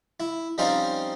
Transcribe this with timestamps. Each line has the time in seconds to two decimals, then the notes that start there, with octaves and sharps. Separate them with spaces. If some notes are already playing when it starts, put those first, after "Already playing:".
0.20 E4
0.58 F3 G3 C4 C#4 D#4 F4